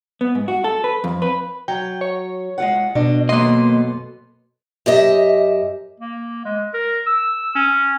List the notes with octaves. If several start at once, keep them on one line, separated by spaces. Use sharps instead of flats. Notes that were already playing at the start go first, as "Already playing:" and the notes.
B3
G#2
F#4
A4
B4
F2
B4
F#3 G5
C#5
G#3 F4 F#5
B2 D4 D#5
F#2 A#3 B3 A4 D#5 C6
F#2 G4 D#5 E5
A#3
G#3
A#4
E6
C#4